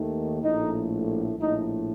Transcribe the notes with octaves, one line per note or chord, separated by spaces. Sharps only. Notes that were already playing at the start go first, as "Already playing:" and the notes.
Already playing: D#2 D#3 A3
A#1 A2 A3 D#4
A#1 A2 A3 D#4